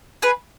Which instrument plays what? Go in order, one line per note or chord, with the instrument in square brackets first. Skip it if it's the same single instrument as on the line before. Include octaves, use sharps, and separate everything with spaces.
[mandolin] G#4 B4